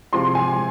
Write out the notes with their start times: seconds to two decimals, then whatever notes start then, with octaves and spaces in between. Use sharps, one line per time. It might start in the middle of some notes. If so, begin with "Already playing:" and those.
0.13 C3 F3 G#3 C6
0.35 G#5
0.52 G#5